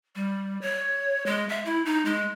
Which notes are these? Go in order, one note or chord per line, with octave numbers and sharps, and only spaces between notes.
G3
C#5
G#3
E5
E4
D#4
G#3